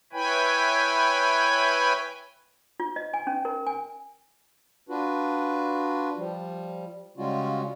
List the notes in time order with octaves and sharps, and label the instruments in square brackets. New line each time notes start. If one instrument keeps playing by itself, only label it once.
[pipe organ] E4 B4 C#5 G5 G#5 B5
[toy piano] F4
D#5
G#5
C#4
A#4
G#5
[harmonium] D4 F4 F#4 B4
F3 G3
C#3 G3 G#3 C#4 F4 F#4